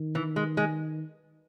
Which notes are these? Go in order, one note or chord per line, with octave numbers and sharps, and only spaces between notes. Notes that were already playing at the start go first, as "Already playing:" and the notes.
Already playing: D#3
E3
G#3
G#3